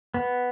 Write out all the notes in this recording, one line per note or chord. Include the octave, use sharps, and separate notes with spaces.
B3